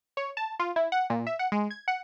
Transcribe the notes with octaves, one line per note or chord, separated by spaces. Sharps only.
C#5
A5
F4
E4
F#5
A#2
E5
F#5
G#3
G#6
F#5